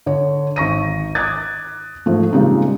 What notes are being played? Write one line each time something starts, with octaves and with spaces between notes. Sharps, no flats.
D3 C#5
G#1 C#6 A#6 D#7
D6 D#6 F#6 G#6 A6
G#2 F3 A3
A#2 C#3 G3 G#3 C4 D#4